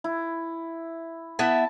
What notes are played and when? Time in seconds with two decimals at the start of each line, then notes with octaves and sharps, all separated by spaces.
0.04 E4
1.39 B3 E4 E5 A5